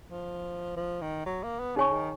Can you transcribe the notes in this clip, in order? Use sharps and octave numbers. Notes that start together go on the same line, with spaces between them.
F3
F3
D#3
F#3
A#3
B3
C#3 D#4 G#4 C#5 G#5 C#6
D#3